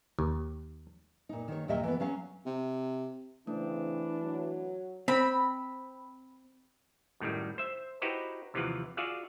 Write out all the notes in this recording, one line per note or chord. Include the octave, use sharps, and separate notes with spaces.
D#2
A#2 D#4
D#3 C#5
D#2 A#2 F#3 D#5 E5 G5
E3 B3
F#3 C#4 F5
C3
C#3 E3 A3 C4 D4
F#3
C4 B5
F#2 A2 D#3 G3
C5 E5
D#4 E4 F#4 G4 B4 C5
D#2 C3 E3 F3 F4 F#5
F4 F#4 G#4 D5 E5 F5